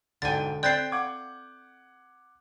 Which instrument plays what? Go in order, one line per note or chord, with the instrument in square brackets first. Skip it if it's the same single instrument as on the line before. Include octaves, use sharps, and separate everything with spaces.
[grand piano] E1 G#2 G5 [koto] D3 G#5 [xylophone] A6
[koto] C4 E4 [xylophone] D5 A6 C7 [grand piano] G5 F#6 G6
[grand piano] F#5 D6 G#6